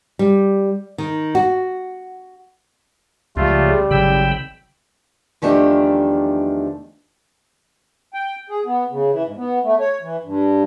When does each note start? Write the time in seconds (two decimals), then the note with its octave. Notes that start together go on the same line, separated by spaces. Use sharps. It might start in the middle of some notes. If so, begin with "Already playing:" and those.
0.19 G3
0.98 D#3
1.35 F#4
3.37 C#2 C#3 F3 G3 A3 F4
3.91 G#1 C#3 F#3 C4 G5 B5 E6
5.42 E2 D#3 F3 A3 D4 G4
8.14 G5
8.49 G#4
8.66 B3
8.91 C#3
9.11 E3
9.25 G#2
9.37 B3
9.64 A3
9.80 C#5
10.02 E3
10.23 G2